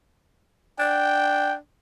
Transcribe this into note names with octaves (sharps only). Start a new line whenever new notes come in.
D4 G5